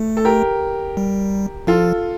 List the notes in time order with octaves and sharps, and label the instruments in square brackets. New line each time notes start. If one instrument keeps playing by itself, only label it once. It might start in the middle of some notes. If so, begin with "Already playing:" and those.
Already playing: [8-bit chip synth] A3 [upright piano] A4
[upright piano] A4
G4 A#4
[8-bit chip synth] G3
[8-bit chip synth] F3 [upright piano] F4 A4